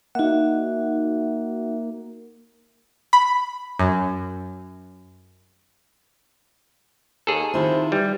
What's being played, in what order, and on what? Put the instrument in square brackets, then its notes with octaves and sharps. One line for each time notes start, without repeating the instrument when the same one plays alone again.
[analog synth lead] A#3 [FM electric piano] D#4 F#5 [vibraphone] F#4 E5
[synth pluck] B5
F#2
[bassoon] D#2 [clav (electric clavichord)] G#4 A4
[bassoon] C3 [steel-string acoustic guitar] D#3 E4 F4
[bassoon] E3 [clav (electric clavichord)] G3